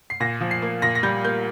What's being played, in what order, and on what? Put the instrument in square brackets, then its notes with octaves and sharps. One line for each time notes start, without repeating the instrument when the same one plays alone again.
[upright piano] C7
A#2 A#6
F3
C7
A#3
A#2 A#6
A#6
G3 G6
A#3 G6